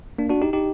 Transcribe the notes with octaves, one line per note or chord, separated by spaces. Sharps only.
A#3 D4
D4 F#4
D#4 G4
D#4 G4